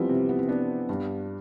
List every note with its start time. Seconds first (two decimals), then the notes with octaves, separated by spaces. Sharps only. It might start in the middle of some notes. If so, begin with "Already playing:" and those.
Already playing: E3 F3 G3 B3 C4
0.09 C3
0.29 B3
0.39 C4
0.48 B3 D4
0.89 G2 D4